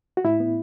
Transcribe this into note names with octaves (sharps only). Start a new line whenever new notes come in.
F#4
A2 E4
B3